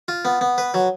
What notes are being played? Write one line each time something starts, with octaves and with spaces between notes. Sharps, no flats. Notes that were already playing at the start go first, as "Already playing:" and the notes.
F4
B3
B3
B4
F#3